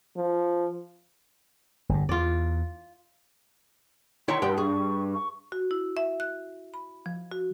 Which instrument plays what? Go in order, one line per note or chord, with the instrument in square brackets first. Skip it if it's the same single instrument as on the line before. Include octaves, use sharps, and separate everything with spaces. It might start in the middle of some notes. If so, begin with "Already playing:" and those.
[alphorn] F3
[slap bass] G1 G2
[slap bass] E2 [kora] F4 D5
[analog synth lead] D#3 [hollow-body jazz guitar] E4 C#5 G5 [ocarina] C6
[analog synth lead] G2 [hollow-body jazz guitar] G4 F#5 G5
[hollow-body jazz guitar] G#4 [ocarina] C#6
[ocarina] C#6
[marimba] F#4
E4
E5
F#6
B5
F3
F#4